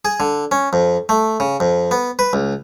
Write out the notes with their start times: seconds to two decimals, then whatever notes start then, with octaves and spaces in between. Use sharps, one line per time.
0.05 G#4
0.20 D3
0.51 C#4
0.73 F2
1.09 A3
1.40 C#3
1.60 F2
1.91 B3
2.19 B4
2.33 C#2